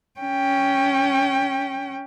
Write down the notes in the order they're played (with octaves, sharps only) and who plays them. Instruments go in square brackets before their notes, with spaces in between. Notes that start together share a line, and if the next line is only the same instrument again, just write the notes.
[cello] C#4 G5